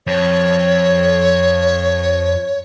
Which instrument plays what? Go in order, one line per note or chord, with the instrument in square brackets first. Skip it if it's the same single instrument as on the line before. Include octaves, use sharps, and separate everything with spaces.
[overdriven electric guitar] F2 [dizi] C#5